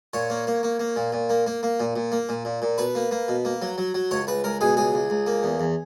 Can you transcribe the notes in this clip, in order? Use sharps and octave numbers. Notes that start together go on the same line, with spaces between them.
A#2 C#5
A#3
A#3
A#3
A#3
A#2
A#2
A#3
A#3
A#3
A#2
A#2
A#3
A#2
A#2
A#2
B2 B4
A#3
A#3
B2
A#3
F#3
F#3
F#3
C#2 C#5
C#2 B4
C#2 A#4
B2 G#4
C#2 G#4
C#2
C#2
A#3
E2
E2